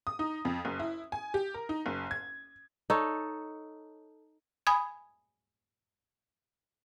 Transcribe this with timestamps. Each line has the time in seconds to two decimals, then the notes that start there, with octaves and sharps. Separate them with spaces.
0.07 D#6
0.19 D#4
0.45 F2
0.65 F#1
0.80 E4
1.12 G#5
1.34 G4
1.54 A#4
1.69 D#4
1.86 F#1
2.11 G#6
2.90 D#4 A4 C#5
4.67 G#5 B5 D#6 G#6